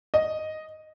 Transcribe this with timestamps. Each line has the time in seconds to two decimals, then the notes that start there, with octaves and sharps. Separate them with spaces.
0.14 D#5